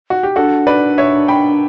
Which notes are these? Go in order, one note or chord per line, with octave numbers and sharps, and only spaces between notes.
F#4
G4
D4 F#4 A4
B4 D5
C#5 E5
G5 B5